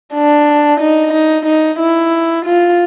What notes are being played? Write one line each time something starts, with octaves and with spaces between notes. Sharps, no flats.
D4
D#4
D#4
D#4
E4
F4